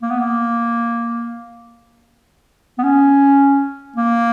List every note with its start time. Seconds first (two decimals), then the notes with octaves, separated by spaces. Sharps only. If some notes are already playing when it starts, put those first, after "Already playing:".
0.02 A#3
0.11 B3
0.20 A#3
2.78 B3
2.84 C#4
3.97 A#3